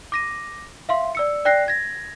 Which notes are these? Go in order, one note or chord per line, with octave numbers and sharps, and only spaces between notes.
D6 A#6 D#7
E5 F5 C6
D5 E6 C#7
D5 G5 F#6 A#6 C7
G#6 A#6